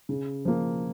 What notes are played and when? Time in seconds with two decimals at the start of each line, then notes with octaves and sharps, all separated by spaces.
0.09 C#3
0.45 F3 A#3